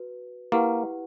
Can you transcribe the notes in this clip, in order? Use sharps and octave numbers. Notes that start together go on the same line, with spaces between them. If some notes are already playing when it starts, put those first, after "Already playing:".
Already playing: F#4 B4
A#3 E4 G4 B4 F#5